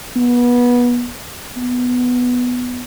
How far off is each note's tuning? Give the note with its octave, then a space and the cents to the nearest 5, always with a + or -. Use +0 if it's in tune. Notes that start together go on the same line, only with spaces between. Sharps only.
B3 -25
B3 +5